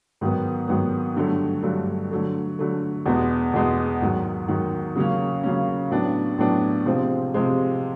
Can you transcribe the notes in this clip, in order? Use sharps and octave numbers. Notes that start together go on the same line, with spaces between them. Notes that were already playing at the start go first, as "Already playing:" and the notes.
G#2 D#3 F#3 B3
G#2 D#3 F#3 B3
G2 D3 F#3 A3
G2 D3 F#3 A3
D3 F#3 A3
D3 F#3 A3
E2 B2 G#3 B3
E2 B2 G#3 B3
G#2 D#3 F#3
G#2 D#3 F#3
C#3 F#3 A#3 C#4
C#3 F#3 A#3 C#4
A2 F#3 B3 D4
A2 F#3 B3 D4
C3 F3 G#3 C4
C3 F3 G#3 C4